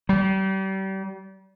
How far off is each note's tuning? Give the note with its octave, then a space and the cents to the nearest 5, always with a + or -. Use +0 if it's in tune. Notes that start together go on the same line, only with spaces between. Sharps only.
G3 -35